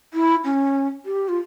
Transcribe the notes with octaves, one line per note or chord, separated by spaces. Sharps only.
E4
C#4
G4
F4